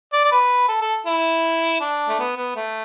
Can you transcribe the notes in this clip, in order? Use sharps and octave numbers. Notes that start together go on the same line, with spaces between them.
D5
D5
B4
A4
A4
E4
D4
A3
B3
B3
A3